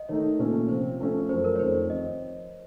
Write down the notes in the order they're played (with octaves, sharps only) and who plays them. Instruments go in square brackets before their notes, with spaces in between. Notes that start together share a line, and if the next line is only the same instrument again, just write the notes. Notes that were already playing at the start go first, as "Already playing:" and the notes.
Already playing: [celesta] D#5
[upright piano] D#3 A3 D#4 [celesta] C#5
[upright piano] A#2 A3 C#4 F4
[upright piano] C3 F3 C4 [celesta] C5
[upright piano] F3 A3 C#4
[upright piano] F#2 F3 A3 [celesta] C5
[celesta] A#4
C#5
[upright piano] F2 D#3 A3 [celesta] C5
[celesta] C#5
[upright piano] F3 C4 [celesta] D#5